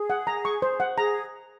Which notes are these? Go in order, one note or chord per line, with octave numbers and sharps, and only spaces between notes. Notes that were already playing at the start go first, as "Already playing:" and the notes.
Already playing: G#4
F#5
A#5
C#6
C5
F#5
G#4 A#5